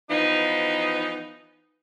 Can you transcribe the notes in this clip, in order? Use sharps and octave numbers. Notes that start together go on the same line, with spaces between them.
E3 F3 B3 D#4